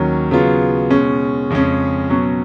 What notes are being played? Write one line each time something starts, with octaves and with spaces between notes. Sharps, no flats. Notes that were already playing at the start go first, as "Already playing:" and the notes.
Already playing: D#2 D#3 F#3 C#4
C#3 F#3 B3 F4
B2 G#3 C#4
F2 C#3 G#3 C#4
B2 F#3 C#4